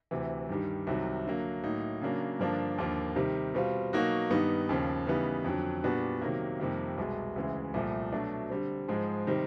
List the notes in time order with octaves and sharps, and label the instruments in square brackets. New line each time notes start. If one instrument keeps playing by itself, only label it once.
[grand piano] D2 C3 E3
G2 D#3 G3
C2 C3 D#3 F#3
D3 F#3 A#3
A2 F#3 A#3 D#4
C#3 F#3 A#3 D4
G2 D3 F3 A#3 D4
D#2 D3 F3 A#3
C3 D#3 G3
B2 G3 C4 F4
B2 F#3 A#3 D#4 F#4
G2 D#3 G3 B3 D#4
D#2 C#3 F3
C#3 E3 G3 B3 D#4
F2 D3 F#3
A#2 G3 B3 D4 F#4
C3 D#3 F#3 A#3
F2 C3 D#3 G3 A#3
C2 B2 G#3
D2 C#3 E3 G#3
C2 A#2 F3 A3
B2 F#3 A3 D4
D3 G3 C4
G#2 F3 G#3
C3 D#3 G3 C4